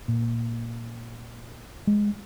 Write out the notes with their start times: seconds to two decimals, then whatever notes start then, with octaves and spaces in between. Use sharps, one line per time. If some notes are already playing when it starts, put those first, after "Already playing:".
0.08 A#2
1.87 G#3